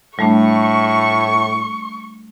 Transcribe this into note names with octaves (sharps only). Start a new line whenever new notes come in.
A2 G3 A3 D4 C#6